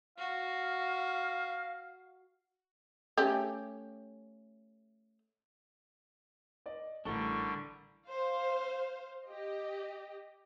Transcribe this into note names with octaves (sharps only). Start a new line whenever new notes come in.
F#4 F5
A3 C#4 G4
D5 D#5
A1 A2 D3 G3 D4 A4 A#4 C#6
C5 F5
G4 D#5